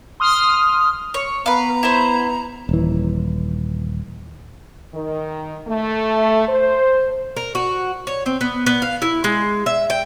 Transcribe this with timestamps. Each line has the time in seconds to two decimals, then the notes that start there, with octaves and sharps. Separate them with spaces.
0.20 C6 D#6 F6
1.14 C#5
1.46 B3 B4 F5 A#5
1.83 E4 C5
2.69 D#1 E3
4.93 D#3
5.67 A3
6.48 C5
7.36 A#4
7.55 F#4
8.07 C#5
8.26 C4
8.41 B3
8.66 B3
8.82 F5
9.02 E4
9.24 G#3
9.66 E5
9.90 G5